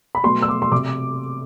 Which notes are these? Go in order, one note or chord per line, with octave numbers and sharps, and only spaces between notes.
B5
B2 F#3 A3 C6
E6
D6
C6
C3 D6